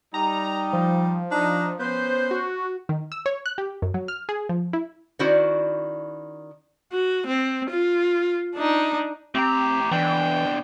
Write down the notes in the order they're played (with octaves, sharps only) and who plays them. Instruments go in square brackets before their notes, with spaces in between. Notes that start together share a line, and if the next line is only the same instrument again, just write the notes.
[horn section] G3 D#4 [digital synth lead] A#5
[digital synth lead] F3
[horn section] D4 D#4
B3 C#4 C5
[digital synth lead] F#4
[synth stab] D#3
E6
C#5
F#6
G4
F#2
F#3
F6
G#4
F3
E4
[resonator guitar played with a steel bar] D#3 C#4 E4 F#4 C5 D5
[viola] F#4
C4
F4
D4 D#4
[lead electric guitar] A2 A#5 [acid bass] C4 [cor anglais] G4
[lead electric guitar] B2 D4 [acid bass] E3 [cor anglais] G5